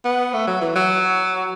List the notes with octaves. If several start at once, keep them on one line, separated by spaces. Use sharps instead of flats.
B3
A3
F#3
E3
F#3